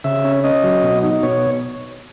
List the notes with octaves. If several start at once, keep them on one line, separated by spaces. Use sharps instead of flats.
C#3 E5
C#4
C#4 D#5
F#3
B2
D#4
B2 C#5